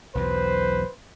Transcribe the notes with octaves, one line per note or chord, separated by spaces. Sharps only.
B1 E2 F#3 B4 C5